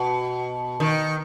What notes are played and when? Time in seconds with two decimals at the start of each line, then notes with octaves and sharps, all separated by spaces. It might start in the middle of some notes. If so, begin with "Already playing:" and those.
Already playing: B2
0.80 D#3